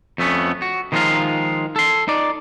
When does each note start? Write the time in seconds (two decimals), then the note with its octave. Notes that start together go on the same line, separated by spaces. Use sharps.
0.18 F2 A3 B3 C#4
0.62 F#4
0.92 D#3 F3 G#3 D#4 F4 F5
1.76 A4 C6
2.08 D#4 D5